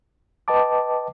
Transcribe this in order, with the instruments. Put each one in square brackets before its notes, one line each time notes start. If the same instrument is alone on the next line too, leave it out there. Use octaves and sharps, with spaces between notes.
[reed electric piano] B4 D#5 G5 A5 D6